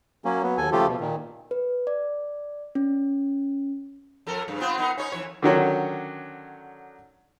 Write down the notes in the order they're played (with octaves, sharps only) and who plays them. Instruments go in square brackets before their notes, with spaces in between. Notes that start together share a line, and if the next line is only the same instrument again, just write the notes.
[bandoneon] F#3 A#3 C#4
F#3 B3
D#2 A4 G#5
C#3 F3 A3 F4 G4 A4
B2
A#2 D#3
[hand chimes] B4
D5
C#4
[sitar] F2 A4 A#4
G2 C#3
B3 C4 F4
B3 D#4 A#4
C#4 D#4 C#5
F2 E3 C#5
[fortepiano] D3 D#3 F#3 C#4